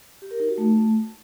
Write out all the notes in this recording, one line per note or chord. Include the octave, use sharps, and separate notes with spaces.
G4
A#4
D#4
F#4
A3